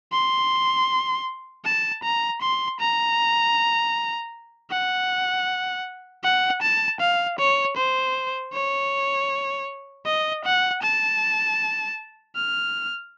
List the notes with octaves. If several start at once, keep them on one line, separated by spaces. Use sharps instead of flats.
C6
A5
A#5
C6
A#5
F#5
F#5
A5
F5
C#5
C5
C#5
D#5
F#5
A5
F6